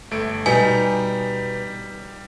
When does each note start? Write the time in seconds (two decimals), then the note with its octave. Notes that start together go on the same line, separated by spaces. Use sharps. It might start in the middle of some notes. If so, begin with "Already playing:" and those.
0.11 G1 A3 D7
0.46 B2 G3 D#4 G4 G#5